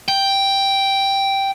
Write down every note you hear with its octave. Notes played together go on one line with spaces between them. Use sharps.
G5